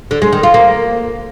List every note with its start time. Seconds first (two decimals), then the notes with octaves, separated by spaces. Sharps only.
0.11 D3
0.22 G#3
0.33 D#3
0.43 F4
0.54 A#3